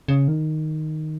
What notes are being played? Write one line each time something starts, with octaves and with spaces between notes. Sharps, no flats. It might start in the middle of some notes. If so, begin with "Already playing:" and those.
C#3
D#3